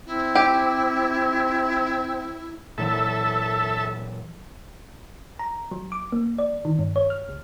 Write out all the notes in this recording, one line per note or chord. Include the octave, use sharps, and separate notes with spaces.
C4 E4
G4
A#2 E3 F#3 A4 E5
A#5
F#3
D6
A#3
D5
D#3
G2
C#5
F6
C#2